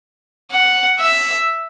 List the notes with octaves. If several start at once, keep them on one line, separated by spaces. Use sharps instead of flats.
F#5
E5